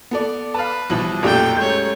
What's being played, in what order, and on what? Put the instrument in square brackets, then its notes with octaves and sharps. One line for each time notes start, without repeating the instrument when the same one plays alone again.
[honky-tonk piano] B3 A4 D5
[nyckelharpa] B4 [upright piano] F5 A5
[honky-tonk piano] B1 F3 F#7 [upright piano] B2 E3 G3
[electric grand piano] B1 A#2 D5 [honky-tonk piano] F#2 G4 [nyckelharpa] A3 G5 [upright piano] A#4
[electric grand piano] G#3 [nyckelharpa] A3 C#5 [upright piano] G6